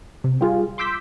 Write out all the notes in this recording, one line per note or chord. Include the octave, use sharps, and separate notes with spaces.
C3
G3 F4 G#4
C6 D6 E6 G6 B6